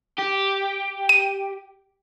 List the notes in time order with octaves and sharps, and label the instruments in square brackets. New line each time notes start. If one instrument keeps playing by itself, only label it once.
[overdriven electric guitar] G4
[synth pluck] D#7